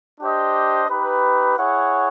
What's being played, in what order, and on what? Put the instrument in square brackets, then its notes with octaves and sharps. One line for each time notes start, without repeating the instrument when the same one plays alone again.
[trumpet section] D4 G4 C5 D#5
D#4 G4 B4
E4 G#4 C#5 F#5